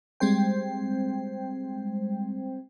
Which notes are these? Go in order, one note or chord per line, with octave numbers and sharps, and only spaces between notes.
G3 G#3 C4 C5 G5